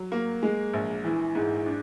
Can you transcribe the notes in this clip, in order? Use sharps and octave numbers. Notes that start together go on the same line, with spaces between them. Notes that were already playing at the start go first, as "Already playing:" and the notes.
Already playing: F#3
A#3
G#3
A#1
E3
G#2
D4